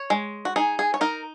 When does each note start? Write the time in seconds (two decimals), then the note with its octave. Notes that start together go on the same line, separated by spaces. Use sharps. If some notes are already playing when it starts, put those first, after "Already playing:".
Already playing: C#5
0.10 G#3
0.45 F#4
0.56 D#4 G#4
0.79 G#4
0.94 C#5
1.01 D#4 A#4